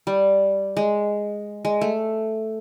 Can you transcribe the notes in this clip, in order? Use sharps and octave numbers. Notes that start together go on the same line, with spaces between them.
G3
G#3
G#3
A3